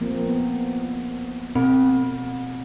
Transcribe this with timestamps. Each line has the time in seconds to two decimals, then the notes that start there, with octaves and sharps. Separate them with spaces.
0.01 F3 A#3 C4
0.26 B3
1.55 B2 C4